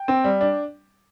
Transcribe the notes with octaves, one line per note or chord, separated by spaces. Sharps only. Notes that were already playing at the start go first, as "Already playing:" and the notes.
Already playing: G5
C4
G3
D4